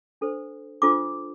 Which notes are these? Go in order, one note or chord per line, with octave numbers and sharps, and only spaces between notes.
D4 A4 C5
D4 F4 A4 C5 D6